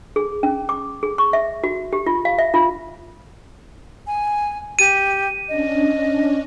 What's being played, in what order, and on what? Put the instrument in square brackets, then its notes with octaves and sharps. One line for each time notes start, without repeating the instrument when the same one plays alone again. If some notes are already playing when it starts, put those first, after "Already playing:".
[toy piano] G#4
C#4
D6
G#4
C#6
E5
F#4
G4
F4
F5
E5
F4
[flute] G#5
[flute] G4 [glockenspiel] D#7
[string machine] C#4 D4 [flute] D#5